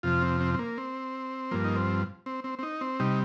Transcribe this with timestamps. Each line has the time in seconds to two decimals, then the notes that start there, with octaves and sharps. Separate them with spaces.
0.03 F2 C3 F3 F4
0.22 C4
0.41 C4
0.54 C4
0.59 A#3
0.78 C4
1.51 G2 F3 A#3
1.64 D#4
1.76 C4
2.26 C4
2.44 C4
2.59 C4
2.63 D#4
2.81 C4
3.00 C3 G3 D#4